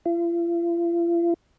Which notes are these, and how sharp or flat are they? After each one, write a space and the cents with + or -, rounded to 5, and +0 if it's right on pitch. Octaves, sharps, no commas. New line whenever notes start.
F4 -45